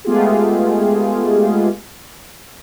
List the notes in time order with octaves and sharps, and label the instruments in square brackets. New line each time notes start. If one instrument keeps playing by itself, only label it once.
[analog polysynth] G#3 A3 B3 F4 G4 G#4